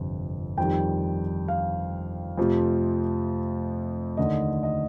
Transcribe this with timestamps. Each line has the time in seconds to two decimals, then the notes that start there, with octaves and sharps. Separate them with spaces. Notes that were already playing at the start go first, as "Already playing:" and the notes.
Already playing: G1 F2 C3
0.57 F2 D#3 G3 G5
1.48 F5
2.38 F2 C3 F3 A3
4.17 D#2 D3 A3 D#5
4.63 D#5